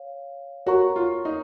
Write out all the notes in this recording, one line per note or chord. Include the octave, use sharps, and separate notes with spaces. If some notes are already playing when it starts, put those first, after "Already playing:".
Already playing: C#5 F5
F#4 A#4 C#5 F#5 A#5 C#6
F4
D#4